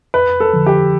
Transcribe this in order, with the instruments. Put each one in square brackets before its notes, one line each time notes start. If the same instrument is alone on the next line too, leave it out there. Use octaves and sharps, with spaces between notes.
[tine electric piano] F2 [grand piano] B4
[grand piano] A4
[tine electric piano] D3 F3
[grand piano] G4